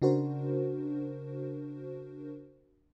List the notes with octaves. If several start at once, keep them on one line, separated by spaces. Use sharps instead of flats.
C#3 D4 F#4 A#4 C5